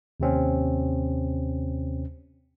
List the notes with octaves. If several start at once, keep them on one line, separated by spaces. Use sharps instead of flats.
D#2 C3 C4 C#4